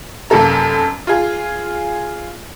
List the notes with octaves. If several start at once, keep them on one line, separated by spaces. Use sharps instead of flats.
F1 F#2 A#3 A4 A#5
F4 G#4